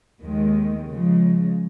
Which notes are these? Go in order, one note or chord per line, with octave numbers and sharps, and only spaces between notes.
D#2 D#3 G#3
C#3 F3 G#3